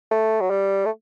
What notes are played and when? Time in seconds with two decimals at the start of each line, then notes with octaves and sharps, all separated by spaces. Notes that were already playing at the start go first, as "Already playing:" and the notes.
0.11 A3
0.41 F#3
0.50 G3
0.85 A3